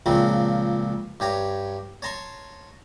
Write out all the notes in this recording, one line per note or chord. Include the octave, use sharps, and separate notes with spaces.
C#2 A#2 C#3 F3 F#3 C4
G2 G4 C#5 A#5
C#5 A5 A#5 C6 C#6